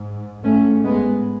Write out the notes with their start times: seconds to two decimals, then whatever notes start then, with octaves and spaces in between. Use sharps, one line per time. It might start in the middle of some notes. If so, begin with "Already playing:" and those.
Already playing: G#2
0.43 G#2 A3 C#4
0.84 G#3 B3